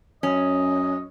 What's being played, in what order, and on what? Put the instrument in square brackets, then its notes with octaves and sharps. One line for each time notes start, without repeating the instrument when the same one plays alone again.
[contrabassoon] F#2 [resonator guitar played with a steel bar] C#4 [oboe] D#5